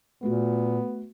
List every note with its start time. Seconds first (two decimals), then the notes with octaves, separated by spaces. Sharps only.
0.23 A#2 A3 B3 F#4